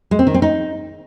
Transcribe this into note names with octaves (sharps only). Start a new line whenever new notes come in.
G#3
C4
D#3
C4
D#4